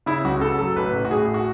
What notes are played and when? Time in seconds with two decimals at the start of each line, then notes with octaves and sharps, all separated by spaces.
0.06 C#3 E4
0.24 C#2 F#4
0.41 C#3 A4
0.59 F#3 A4
0.76 A1 B4
0.93 A1
1.05 F#4
1.11 A2 G#4
1.34 F#4